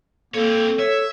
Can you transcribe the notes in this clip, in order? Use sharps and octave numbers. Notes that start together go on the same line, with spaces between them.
A#3 C4 A4 C#5
C#5 E5